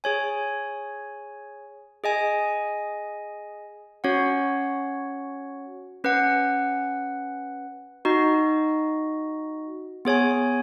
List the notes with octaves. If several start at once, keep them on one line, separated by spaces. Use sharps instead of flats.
G#4 C#5 G#5
G#4 D#5 G#5
C#4 F#4 C#5 F#5
C#4 B4 F#5
D#4 F#4 D#5
B3 G#4 C#5 G#5